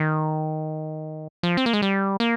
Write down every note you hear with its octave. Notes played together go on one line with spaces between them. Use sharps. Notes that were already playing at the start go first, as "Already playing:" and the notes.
Already playing: D#3
F3
C4
A#3
G#3
G3
A#3